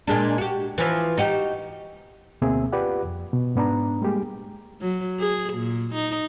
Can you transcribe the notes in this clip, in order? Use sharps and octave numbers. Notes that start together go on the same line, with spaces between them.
A#2 G#3 D4
F#4 G4
E3 F3
D#4 F#4 G4
D2 B2 A#3 C4 G#4 E5
F4 G4 B4 D5 F#5
F2
B2
G#2 B3 D4 A#5
G3 G#3 A#3 G4 G#4
F#3
G#4
A#2
D#4